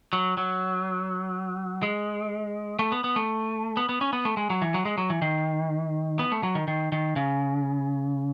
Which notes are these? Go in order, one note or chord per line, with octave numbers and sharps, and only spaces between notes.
F#3
F#3
G#3
A3
B3
B3
A3
B3
B3
C#4
B3
A3
G#3
F#3
E3
F#3
G#3
F#3
E3
D#3
B3
A3
F#3
D#3
D#3
D#3
C#3